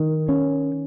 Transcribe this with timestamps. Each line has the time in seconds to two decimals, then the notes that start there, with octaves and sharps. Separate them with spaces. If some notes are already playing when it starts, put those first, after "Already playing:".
Already playing: D#3
0.29 C#4